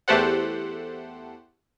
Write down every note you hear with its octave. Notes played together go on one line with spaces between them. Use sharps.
E2 A3 G4 A4 C5 F#5